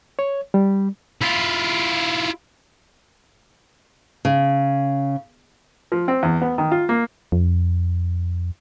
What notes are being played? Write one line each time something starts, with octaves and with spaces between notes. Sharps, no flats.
C#5
G3
E4 F4
C#3
F3
C4
E2
B3
D#3
F4
A#3
F2